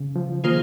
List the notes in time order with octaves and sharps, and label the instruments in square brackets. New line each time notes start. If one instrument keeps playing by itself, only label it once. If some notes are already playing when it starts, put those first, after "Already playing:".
Already playing: [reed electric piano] C#3
F3
[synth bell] D#3 A#3 F4 G#4 C5